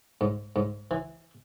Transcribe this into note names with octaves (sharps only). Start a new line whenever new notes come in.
G#2
G#2
E3